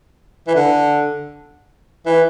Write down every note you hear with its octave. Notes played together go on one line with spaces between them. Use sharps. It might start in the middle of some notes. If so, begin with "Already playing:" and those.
E3
D3
E3